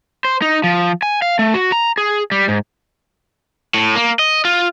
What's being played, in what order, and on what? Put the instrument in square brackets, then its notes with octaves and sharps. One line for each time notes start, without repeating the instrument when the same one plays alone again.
[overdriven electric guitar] C5
D#4
F3
G#5
F5
A3
F#4
A#5
G#4
G3
G#2
A2
A#3
D#5
F4